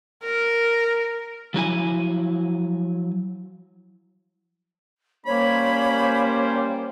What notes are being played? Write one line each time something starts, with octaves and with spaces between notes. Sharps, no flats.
A#4
F3 F#3 E4 G#5
G3 A#3 C#4 C5 C#5 B5